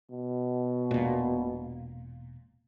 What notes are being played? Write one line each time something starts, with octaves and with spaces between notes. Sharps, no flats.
B2
E1 A#2